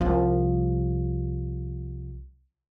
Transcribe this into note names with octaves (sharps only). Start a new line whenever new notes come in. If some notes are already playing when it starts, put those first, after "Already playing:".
C2 F3